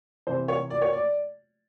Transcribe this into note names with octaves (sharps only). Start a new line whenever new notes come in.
C3 E3 C5
C#5
D5
C#5
D5